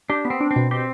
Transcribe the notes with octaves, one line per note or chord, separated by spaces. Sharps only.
D4 G4
B3
C4
D4
C4
B2
C4 G4